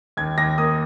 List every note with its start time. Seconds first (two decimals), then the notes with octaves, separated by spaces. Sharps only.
0.17 D#2 G#6
0.38 D#2 A#6
0.58 A#3 D#6